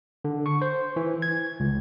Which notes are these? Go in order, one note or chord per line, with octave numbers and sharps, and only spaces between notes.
D3
C#6
C5
E3
G#6
C#2